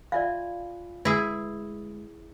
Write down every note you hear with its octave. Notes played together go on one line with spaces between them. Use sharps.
F4 D5 E5 F5 G#5 B5
D2 G#3 E4 G#4 B4